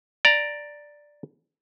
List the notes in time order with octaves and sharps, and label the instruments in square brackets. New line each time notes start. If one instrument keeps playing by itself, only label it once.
[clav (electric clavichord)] D5 A#5